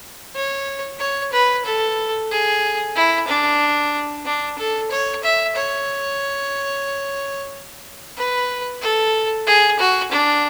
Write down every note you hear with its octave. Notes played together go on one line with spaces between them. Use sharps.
C#5
C#5
B4
A4
G#4
E4
D4
D4
A4
C#5
E5
C#5
B4
A4
G#4
F#4
D4